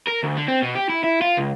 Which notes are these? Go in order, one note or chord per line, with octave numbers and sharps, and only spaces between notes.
A#4
D2
D3
C4
B2
G4
E4
E4
F4
C#2